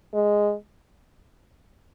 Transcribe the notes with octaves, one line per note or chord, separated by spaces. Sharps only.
G#3